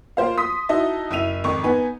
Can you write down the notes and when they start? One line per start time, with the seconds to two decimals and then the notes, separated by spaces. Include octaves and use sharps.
0.17 A#3 F4 C5 F5
0.37 C6 D#6 B6
0.69 D#4 E4 F#4 D#5 E5 A5
1.11 F#1 E4 E5 D#7 F7
1.44 G#1 F2 C#6
1.64 B3 D#4 B4 G#5